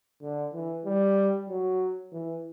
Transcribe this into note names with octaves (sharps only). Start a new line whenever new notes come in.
D3
E3
G3
F#3
E3